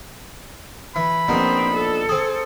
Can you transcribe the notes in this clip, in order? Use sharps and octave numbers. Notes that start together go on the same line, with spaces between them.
E3 B5
A#1 B3 C4 D#4
A4
C4 G#4